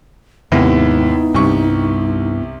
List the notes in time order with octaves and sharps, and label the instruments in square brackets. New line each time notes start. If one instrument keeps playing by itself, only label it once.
[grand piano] D#2 C3 [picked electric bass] G#2 [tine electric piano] B3 E4 [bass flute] D#4
[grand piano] C2 C3 C#6 [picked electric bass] G2